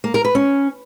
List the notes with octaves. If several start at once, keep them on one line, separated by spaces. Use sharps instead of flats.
A#3
A#4
B4
C#4